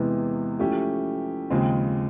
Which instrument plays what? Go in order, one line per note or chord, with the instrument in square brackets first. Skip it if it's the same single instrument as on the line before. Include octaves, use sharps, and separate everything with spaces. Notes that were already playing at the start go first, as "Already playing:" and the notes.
Already playing: [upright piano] E2 C3 E3 G#3 B3
F3 A3 C#4 E4 G4
D#2 C#3 F3 G#3 C4